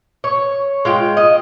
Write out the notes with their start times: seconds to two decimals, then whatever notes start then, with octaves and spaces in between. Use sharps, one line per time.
0.24 C#5
0.85 G#3 F4 G5
1.17 D#5